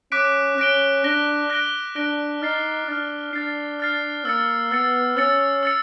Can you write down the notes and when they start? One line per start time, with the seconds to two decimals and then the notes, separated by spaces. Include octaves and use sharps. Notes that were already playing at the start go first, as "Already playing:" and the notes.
0.12 C#4 D6 F#6 B6 D7
0.58 C#4 F#6 A#6 D7 G7
1.04 D4 F#6 A#6 D7 G7
1.50 F#6 A#6 D7 G7
1.96 D4 F#6 A#6 D7 G7
2.42 D#4 F6 A6 C7
2.88 D4 F6 A6 C7
3.33 D4 F6 A6 C7
3.80 F6 A6 C7
4.25 A#3 E6 A6 C#7
4.71 B3 E6 A6 C#7
5.17 C#4 E6 A6 C#7
5.63 E6 A6 C#7